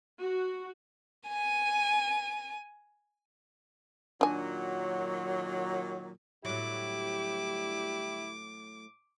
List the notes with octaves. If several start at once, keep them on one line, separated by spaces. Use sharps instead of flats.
F#4
G#5 D#7
A#2 D#3 F#3 D4 G#5
D2 A2 F#3 G3 E4 G4 D6